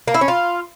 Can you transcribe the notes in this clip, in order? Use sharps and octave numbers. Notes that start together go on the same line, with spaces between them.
A#3
E4
C#4
F4